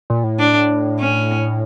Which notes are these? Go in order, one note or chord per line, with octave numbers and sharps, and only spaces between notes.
A#2
A2
D4
C#4